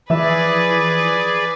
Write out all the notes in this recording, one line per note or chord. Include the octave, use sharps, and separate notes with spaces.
E3 F3 G#4 B4 D5 E5